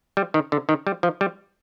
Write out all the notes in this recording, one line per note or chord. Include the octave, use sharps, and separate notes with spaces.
G3
D#3
D3
D#3
G3
F3
G3